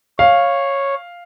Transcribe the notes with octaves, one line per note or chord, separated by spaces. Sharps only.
C#5 F5